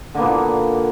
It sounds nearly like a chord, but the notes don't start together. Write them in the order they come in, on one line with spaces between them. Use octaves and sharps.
D3 A#3 B3 A#2